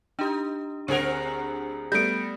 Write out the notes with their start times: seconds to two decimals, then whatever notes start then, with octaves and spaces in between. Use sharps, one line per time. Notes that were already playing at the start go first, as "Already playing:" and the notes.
0.19 D4 D#4 G4
0.88 D2 C4 G#4 A#4 F#5
1.92 G3 A3 B3 G6 A#6 C#7 D7